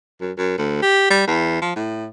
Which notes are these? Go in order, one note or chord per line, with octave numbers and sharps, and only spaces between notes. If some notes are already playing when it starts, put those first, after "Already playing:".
F#2
F#2
D2
G4
G3
E2
F3
A2